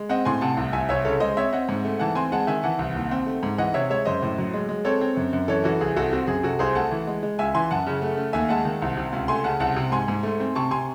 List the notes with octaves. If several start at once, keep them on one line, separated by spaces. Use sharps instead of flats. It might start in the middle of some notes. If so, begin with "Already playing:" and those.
Already playing: G#3
C4 D#5 F#5
A2 G#5 C6
C3 F#5 A5
C2
C2 E5 G#5
C2 C#5 E5
C#3 A4 C#5
G#3 C5 D#5
C4 C#5 E5
C4 D#5 F#5
G#2
A3
E3 F#5 A5
C4 G#5 C6
G#3 F#5 A5
D#3 E5 G#5
E3 F#5 A5
C2
D#2
C4
A3
G#2
E3 D#5 F#5
C3 C#5 E5
G#3 C#5 E5
F#2 C5 D#5
A2
F#3
G#3
G#3
C4 A4 C#5
C4
F#2
F#2
E3 A4 C#5
E3 F#4 A4
C2 G#4
C2 F#4 A4
C4 F#4
F#2 G#4
C3 F#4 A4
C2 G#4 C5
A3 F#5 A5
E3
G#3
G#3
C#2 E5 G#5
E3 G#5 C6
F#2 F#5 A5
C#3
A3
A3
D#2 E5 G#5
G#3 F#5 A5
D#3
C2
C3
C#2
A3 G#5 C6
C#3 F#5 A5
C2 F#5 A5
C3
G#2 G#5 C6
G#2
A3
C4
C3 A5 C#6
C3 G#5 C6